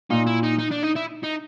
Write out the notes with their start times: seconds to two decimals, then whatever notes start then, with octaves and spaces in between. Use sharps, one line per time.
0.10 A#2 D#4
0.27 E4
0.43 D#4
0.58 D#4
0.71 D4
0.83 D#4
0.95 E4
1.23 D#4